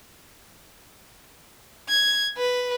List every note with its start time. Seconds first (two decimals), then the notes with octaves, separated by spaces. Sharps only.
1.89 G#6
2.37 B4